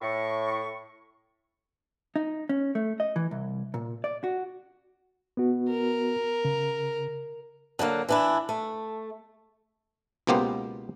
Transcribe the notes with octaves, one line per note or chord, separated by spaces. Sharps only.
A2 C#6
D#4
C#4
A3
D#5
E3
C2
A#2
D5
F#4
B3 F#4
A#4
C#3
D3 F#3 G#3 A#3
E3 D4 E4
A3
C#2 B2 A#3 B3 G4 C5